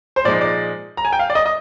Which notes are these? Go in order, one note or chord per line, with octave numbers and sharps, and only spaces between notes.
C5
A#2 F3 G#3 D#4 D5
D5
A#5
G#5
G5
F5
D5
D#5
D#5